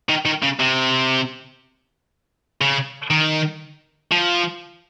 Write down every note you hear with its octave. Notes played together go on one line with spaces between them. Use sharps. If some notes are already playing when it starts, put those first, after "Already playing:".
D#3
D#3
C#3
C3
C#3
D#3
F3